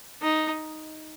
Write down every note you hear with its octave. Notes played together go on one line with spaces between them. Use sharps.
D#4